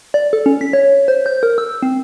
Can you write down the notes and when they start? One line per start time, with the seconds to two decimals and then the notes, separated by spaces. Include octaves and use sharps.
0.14 D5
0.33 A4
0.46 C#4
0.61 B6
0.73 C#5
1.08 C5
1.26 G6
1.43 A#4
1.58 E6
1.83 C4